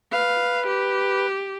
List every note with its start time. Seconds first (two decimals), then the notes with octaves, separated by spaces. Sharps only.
0.12 B4 F5
0.67 G4